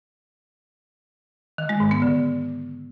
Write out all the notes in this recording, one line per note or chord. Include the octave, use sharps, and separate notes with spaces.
D#3
G#3
G#2
B3
D3